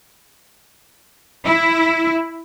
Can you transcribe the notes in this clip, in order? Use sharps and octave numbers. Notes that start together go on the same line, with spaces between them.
E4